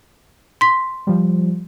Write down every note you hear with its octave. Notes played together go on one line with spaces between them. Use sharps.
C6 B6
F3 G3